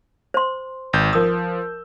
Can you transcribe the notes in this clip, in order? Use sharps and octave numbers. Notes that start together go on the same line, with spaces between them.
C5 C6
G#1 G6
F3 A#4 D#6 E6